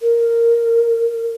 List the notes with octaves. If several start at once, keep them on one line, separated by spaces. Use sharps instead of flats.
A#4